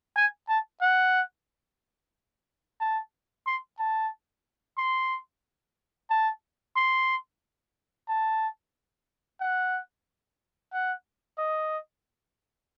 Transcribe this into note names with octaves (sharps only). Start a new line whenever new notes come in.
G#5
A5
F#5
A5
C6
A5
C6
A5
C6
A5
F#5
F#5
D#5